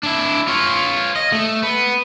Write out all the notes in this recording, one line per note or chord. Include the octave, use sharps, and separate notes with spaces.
D4 E4
F4 C#5
D#5
A3
B3